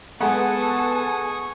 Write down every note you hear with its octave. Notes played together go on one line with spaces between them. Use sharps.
G#3 B3 A4 F#5 G#5 C#6 D#6